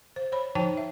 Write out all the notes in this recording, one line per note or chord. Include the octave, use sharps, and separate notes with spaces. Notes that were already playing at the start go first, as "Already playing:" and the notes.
C5
C5 C#5 B5
F3 D#4 C5 C#5 G5 A5
E5